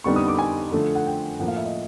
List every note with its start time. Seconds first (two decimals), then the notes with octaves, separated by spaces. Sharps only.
0.04 F2 D3 G3 B3 D#4 C#6
0.16 D#6
0.28 D6
0.39 G#5
0.72 D3 F3 A3
0.95 F#5
1.06 G5
1.40 A2 F3 A#3 F#5
1.48 F5
1.57 E5
1.65 D#5